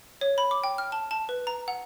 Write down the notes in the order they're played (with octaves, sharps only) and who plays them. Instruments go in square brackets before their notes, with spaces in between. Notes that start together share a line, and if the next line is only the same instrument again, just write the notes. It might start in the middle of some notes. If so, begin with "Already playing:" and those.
[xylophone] C#5
B5
D6
G5
F6
A5
A5
B4
A#5
F#5